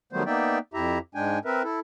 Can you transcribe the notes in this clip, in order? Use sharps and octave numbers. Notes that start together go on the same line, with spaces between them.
D#3 F#3 G3 A3 B3 C5
A#3 B3 D#4 D5 E5 G5
F2 E4 G4 E5 A#5
G#2 G#3 D4 G5 G#5
C4 A#4 B4 E5
E4 A4